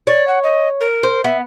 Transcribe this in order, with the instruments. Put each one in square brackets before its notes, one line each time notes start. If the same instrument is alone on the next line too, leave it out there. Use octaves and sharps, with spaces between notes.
[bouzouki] C#5 [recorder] D5
[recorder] F#5
D#5
A#4
[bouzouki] C5
[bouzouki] B3 [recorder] E5